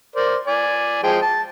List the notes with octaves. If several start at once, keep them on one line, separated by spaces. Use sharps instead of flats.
A#4 C5 D5
D5 G#5
F3 G#3 G5
A5